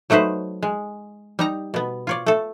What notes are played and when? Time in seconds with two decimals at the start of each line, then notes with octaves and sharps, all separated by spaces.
0.10 F#3 A3 D#4 B4 C5
0.63 G#3
1.39 G3 D#4 A#5
1.74 B2 B3
2.07 F4 C#5 D5
2.26 A3 A4